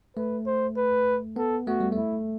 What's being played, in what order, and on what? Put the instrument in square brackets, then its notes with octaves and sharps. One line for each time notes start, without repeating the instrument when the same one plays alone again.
[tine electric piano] A3 [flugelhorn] B4
[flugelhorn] C5
B4
[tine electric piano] B3 [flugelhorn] A4
[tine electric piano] A3 [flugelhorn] F#4
[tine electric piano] G3
[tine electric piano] A3 [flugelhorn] E4